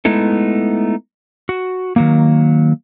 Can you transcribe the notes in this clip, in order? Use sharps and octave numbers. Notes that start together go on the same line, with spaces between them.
G#3 A3 B3 D#4 E4 A4
F#4
D#3 F#3 A#3